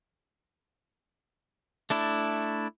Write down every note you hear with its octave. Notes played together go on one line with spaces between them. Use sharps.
A3 D4 E4